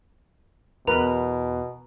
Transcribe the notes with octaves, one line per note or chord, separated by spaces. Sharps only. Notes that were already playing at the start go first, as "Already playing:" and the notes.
E2 B2 E4 A#4 B4 A#5